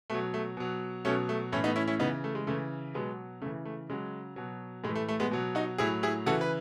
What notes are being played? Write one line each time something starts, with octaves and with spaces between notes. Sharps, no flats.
B2 F#3 A3
A3
B2 F#3
B2 F#3 A3 C#4
A3
A2 E3 A3 C#4
B3 D#4
C#4 E4
C#4 E4
C#3 E3 B3 D#4
A3
G#3
C#3 E3 A3
B2 F#3 G#3 B3
C#3 E3 A3
A3
C#3 F#3 G#3
B2 F#3
A2 G#3
E3
A3
A3
G#3 B3
B2 F#3
D#4 F#4
A2 F#3 E4 G#4
E4 G#4
C#3 E3 F#4 A4
B4